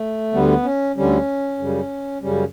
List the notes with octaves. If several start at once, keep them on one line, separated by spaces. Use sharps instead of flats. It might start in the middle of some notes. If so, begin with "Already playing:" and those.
Already playing: A3
D2 D3 G3 B3
C#4
D2 D3 G3 C#4
F#2 C#3 G3
F#2 C#3 G3 C#4